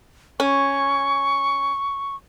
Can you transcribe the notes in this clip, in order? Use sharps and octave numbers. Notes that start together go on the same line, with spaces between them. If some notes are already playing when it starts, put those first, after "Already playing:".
C#4 C#6